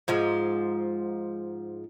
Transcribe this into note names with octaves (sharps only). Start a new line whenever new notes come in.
G#2 F3 G#3